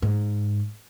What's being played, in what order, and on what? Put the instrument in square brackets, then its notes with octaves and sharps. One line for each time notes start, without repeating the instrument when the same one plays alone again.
[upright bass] G#2